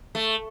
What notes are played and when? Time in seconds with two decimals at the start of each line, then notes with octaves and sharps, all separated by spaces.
0.15 A3